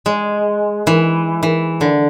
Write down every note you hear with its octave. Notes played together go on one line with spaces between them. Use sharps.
G#3
E3
E3
D3